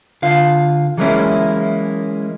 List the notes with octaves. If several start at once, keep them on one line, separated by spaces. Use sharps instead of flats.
D3 F4 F5
E3 F#3 G#3 A#3 C#4 E4